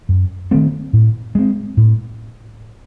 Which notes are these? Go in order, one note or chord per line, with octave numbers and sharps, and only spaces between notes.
F#2
D#3 A3 C4
A2
G#3 C4
A2